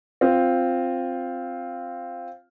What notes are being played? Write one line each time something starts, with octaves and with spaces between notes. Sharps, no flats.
C4 F4